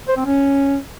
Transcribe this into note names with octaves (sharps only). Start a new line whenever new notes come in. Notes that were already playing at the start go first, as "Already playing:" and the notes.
C5
C4
C#4